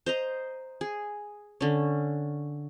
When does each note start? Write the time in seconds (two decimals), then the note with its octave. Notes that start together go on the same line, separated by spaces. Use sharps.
0.06 C5 D#5 A#5
0.81 G#4
1.61 D3 C#4